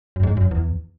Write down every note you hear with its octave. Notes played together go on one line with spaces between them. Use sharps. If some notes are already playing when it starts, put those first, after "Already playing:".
F#2
G#2
F#2
E2